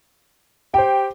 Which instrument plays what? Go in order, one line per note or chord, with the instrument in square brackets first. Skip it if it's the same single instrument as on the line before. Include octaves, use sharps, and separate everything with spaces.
[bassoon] G4 [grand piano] C5 G5